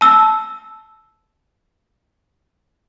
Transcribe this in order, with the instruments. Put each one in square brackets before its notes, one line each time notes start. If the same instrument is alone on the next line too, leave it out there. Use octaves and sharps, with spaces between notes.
[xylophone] A5 E6